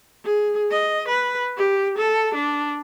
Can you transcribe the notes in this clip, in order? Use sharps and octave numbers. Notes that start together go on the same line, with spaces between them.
G#4
D#5
B4
G4
A4
D4